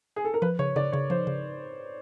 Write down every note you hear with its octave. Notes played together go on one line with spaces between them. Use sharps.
G#4
A4
A#4
F3 B4
C#3 C#5
C#3 D5
C#3 C#5
F3 C5
C#3